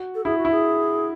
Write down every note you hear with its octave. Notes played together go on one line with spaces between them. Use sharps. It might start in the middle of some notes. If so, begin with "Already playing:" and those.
Already playing: F#4
A4
E4 G#4
F#4
E4
G#4